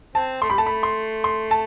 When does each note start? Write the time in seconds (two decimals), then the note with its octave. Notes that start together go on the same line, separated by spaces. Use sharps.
0.15 C4 A5
0.42 A3 C6
0.50 G3 B5
0.58 A3 A5
0.66 B5
0.83 C6
1.24 C6
1.51 A5